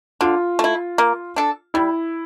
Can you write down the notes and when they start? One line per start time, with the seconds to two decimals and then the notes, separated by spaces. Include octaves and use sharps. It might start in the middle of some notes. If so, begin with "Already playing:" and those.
0.21 D3 F4
0.59 A3 E4
0.98 A#3
1.36 D4 A4
1.74 G3 E4